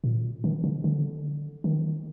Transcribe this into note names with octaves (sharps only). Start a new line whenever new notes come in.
A#2
D#3
D3
D3
D#3